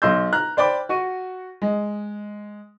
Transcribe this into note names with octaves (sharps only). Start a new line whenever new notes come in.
B1 D#5 C6 E6 G6
A#5 F6 F#6
C5 D5 G5 B5 D6
F#4 C#6 D#7
G#3